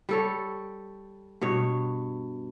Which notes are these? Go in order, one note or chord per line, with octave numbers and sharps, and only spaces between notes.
G3 A4 C#5
G2 B2 C#5